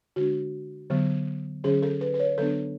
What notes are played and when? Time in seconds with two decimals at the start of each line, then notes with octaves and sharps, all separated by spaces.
0.16 D3 G#3 D4 F#4
0.90 D3 F#3 B3
1.64 D3 F#3 C#4 G#4
1.82 A4
2.01 B4
2.14 B4
2.20 C#5
2.38 D3 F#3 B3 D4 A4